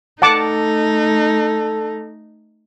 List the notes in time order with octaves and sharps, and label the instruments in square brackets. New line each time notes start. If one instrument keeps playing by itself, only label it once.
[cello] A3 D#4 [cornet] A4 [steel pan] F#5 A5 D6